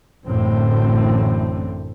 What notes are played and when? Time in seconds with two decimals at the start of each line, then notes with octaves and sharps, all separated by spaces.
0.25 A1 F#2 A2 D3 A3 C4